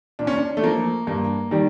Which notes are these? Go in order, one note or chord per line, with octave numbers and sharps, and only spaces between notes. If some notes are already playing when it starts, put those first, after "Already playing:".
A#2 D4
C#4
D4
A3
F3 A#3
G2 A#3
D#3 G3